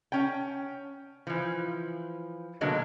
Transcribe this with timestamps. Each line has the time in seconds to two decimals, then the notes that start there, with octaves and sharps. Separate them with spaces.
0.12 C#4 G5
1.27 E3 F3
2.61 B2 D3 F#3 G#3 A#3